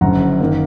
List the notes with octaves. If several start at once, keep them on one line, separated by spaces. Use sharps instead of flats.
F#1 F#2 D3 F#5 A#5
D#3 A#3 D#4